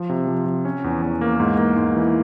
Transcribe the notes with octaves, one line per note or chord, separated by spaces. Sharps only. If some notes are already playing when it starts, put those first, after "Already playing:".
Already playing: F3
C3
F3
F3
C#4
E2
E2
A#3
G#2
A#3
G#2
E3